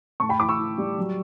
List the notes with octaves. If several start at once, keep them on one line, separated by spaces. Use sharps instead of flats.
A2 A5 C#6
G5 B5
E3 B5 D6
C#6 E6
E3
G3
F#3